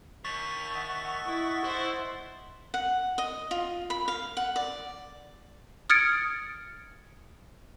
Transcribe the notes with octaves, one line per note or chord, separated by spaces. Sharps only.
D#2 C#6 A6 B6
D#5 E5 F#5
E4
E4 C5
F#5
D#5
F4
B5
F5
F#5
D5
D#6 F6 G#6 A6 C#7 D7